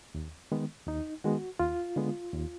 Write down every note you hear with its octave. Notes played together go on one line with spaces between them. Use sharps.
D#2
D#3 G#3 B3
D#2 D#4
D#3 G#3 B3 F#4
D#2 F4
D3 G#3 B3
D#2